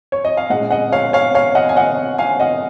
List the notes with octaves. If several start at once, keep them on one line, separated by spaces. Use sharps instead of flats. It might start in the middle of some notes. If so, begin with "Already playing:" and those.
C#5
D#5
F5
A#2 G#3 C#4 D#5 F#5
D#5 F#5
C#5 F5
C#5 F5
C#5 F5
D#5 F#5
G#5
D#5 F#5
F5 G#5
D#5 F#5